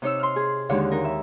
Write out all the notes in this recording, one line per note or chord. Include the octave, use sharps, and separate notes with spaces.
C3 D#4 C#5 E6
C6 F6
G#4
D#2 D3 D#3 G#3 C#5 F5
D#4 A#4
E5